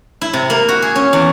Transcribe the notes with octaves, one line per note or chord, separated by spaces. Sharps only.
E4
C3
A#3
F#4
G#4
C#4
E2